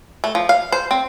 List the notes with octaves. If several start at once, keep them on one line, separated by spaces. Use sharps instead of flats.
A3
F3
F5
C5
C4